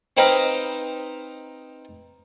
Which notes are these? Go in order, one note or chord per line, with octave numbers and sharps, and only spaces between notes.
C4 D#4 B4 C5 D#5 F5